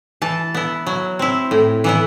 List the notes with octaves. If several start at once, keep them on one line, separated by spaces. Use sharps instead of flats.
E3 A5
B3 E4
F#3
C4 E4
A2
E3 B3 E4